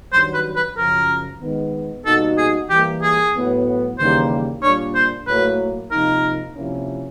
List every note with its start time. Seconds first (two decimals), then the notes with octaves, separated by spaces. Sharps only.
0.12 G2 D#3 F#3 C5
0.34 B4
0.56 B4
0.77 F#2 C#3 F3 A#4
1.41 D#3 G#3 B3
2.05 B2 G3 A#3 D#4 F#4 A4
2.37 G#4
2.69 E3 G3 A#3 G4
3.02 G#4
3.34 A2 F#3 B3
3.98 D#2 C#3 E3 G3 A#3 C5
4.62 A#2 G3 A#3 D4 C#5
4.95 C5
5.27 A2 F#3 A#3 B4
5.91 C3 F3 A#3 D#4 A#4
6.56 C3 F3 A#3 C#4 E4